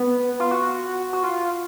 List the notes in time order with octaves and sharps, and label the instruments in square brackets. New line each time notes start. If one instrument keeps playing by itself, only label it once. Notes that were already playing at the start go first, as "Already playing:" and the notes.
Already playing: [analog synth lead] B3
F4
F#4
F#4
F4